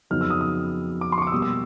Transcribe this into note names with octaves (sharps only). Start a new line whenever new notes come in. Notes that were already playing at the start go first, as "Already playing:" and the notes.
F2 C#3 F#3 B3 D#4 F6
E6
D#6
D#6
D6
C6
C#6
D6
E6
B2 G3 A#3 D#6
E6